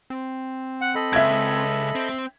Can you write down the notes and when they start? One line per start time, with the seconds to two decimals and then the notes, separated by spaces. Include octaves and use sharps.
0.10 C4
0.81 F#5
0.95 A4 D#5 B5
1.13 C#2 E5 G#6
1.95 C4